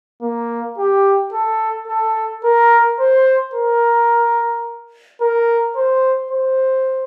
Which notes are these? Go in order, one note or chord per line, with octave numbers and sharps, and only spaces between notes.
A#3
G4
A4
A4
A#4
C5
A#4
A#4
C5
C5